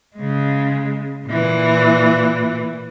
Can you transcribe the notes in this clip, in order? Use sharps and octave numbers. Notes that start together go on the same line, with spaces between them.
C#3 G#3
A#2 E3